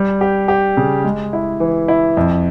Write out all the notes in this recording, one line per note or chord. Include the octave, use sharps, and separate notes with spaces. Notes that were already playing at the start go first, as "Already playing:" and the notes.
Already playing: G3
G4
G4
C#3
G#3
E4
E3
E4
F2